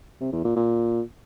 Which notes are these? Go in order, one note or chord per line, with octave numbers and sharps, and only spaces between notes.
C3
E2
A#2
A#2